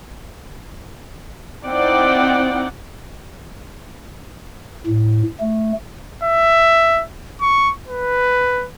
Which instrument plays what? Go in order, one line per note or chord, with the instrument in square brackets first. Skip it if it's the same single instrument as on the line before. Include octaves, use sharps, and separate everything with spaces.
[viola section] C4 D#4 E4 D5 F#5 G5
[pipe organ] A2
A3
[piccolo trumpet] E5
C#6
B4